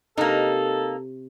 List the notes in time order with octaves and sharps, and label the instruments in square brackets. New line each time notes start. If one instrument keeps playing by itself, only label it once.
[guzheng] C3 [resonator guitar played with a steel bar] A#3 D#4 [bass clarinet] A4